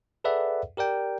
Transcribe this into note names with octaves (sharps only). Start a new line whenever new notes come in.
G#4 A4 B4 D5 E5 F#5
G4 A#4 D5 G5